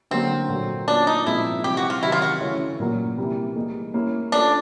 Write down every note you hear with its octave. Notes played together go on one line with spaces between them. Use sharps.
D3 F#3 A#3 C4
A#2 F#3 A3
A#3 C#4 D4 F4
D#4
A#2 F3 G#3 C4 E4 F4
C3 E3 G3 C4 F4 G4
F#4
F4
C3 D#3 F#3 E4
F4
F#4
C#3 E3 A3 C#4 E4
A#2 F#3 A#3
C3 E3 G3 A#3
G3 A#3 D#4 G#4
A#3 C#4 E4
A3 C#4 D4 F4 A4 C#5